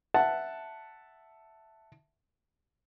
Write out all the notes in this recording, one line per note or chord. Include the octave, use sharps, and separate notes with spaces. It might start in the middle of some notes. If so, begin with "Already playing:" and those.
E5 F#5 A5